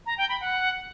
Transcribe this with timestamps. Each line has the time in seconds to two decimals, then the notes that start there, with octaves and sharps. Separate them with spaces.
0.06 A#5
0.18 G5
0.29 B5
0.41 F#5